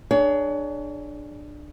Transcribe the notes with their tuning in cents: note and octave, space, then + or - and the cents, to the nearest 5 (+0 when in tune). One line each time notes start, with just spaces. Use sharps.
D4 +20 G#4 +0 C#5 +30